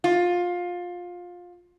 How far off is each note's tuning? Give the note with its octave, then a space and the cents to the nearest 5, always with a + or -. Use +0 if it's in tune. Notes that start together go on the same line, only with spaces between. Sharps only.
F4 +20